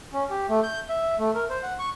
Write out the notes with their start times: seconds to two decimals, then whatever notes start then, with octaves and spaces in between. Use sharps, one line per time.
0.13 C#4
0.30 G4
0.49 A3
0.63 G6
0.89 E5
1.18 A3
1.35 A#4
1.50 C5
1.63 F#5
1.79 C#6